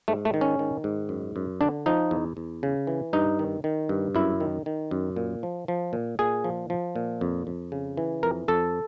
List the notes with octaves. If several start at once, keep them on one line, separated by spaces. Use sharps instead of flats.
G#2 A3
A3
D#3
C#4
D#3
G#2
F#2
F#2
D3 D4
F3 D#4
E2
E2
C#3
E3
G2 D#4
D#3
D#3
G2
F#2 E4
D#3
D#3
F#2
A#2
F3
F3
A#2
A#2 G#4
F3
F3
A#2
F2
F2
C#3
E3
F2 A#4
F2 A4